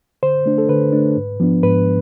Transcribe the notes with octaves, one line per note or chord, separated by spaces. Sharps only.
D3 C5
A3 D4
A4
D3 B4
A3 D4
G#2
F3 B3 D4
G#2 B4